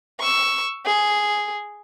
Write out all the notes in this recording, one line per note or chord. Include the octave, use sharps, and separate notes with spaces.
C#6 E6
G#4